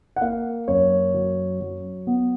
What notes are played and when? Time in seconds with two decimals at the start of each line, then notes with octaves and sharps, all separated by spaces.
0.16 F#5
0.21 A#3 F5
0.68 F#2 C#5
1.14 F#3
1.61 F#3
2.07 B3